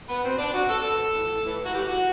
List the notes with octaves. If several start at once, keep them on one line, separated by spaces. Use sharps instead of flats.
B3
B2 C4
D4
B2 F#4
A4
B2 A4
A2 E3
A2 E3
F#4
A2 E3 G4
F#4